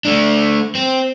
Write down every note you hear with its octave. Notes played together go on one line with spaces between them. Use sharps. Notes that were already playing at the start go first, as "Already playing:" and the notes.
A3 D4
C4